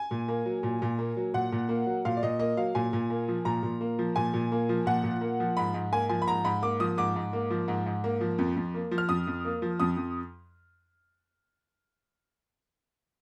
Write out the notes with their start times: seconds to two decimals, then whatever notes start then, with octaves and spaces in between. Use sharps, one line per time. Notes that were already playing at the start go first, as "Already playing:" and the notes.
Already playing: G#5
0.11 A#2
0.28 A#3
0.46 F#3
0.63 A#2
0.82 A#2
0.99 A#3
1.17 F#3
1.34 A#2 F#5
1.52 A#2
1.69 A#3
1.87 F#3
2.05 A#2 F5
2.17 D5
2.23 A#2 D#5
2.39 A#3 D#5
2.57 F#3 F5
2.75 A#2 G#5
2.93 A#2
3.10 A#3
3.28 F3
3.45 A#2 A#5
3.63 A#2
3.81 A#3
3.99 F3
4.16 A#2 G#5
4.34 A#2
4.52 A#3
4.69 F3
4.86 A#2 F#5
5.04 A#2
5.21 A#3
5.40 F3
5.57 G#2 B5
5.74 G#2
5.92 A#3 G#5
6.09 F3 G#5
6.22 B5
6.27 G#2 A#5
6.44 G#2 B5
6.62 A#3 D6
6.80 F3 D#6
6.98 G#2 D6
7.16 G#2
7.33 A#3
7.51 F3
7.68 G#2
7.86 G#2
8.04 A#3
8.21 F3
8.38 F2
8.56 F2
8.74 A#3
8.91 F3
8.98 F6
9.09 F2 D#6
9.27 F2
9.45 A#3
9.62 F3
9.80 F2 D#6
9.97 F2